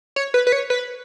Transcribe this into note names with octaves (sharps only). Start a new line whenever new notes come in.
C#5
B4
B4
C#5
B4